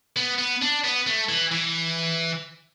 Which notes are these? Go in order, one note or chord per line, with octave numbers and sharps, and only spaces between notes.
B3
B3
D4
B3
A3
E3
E3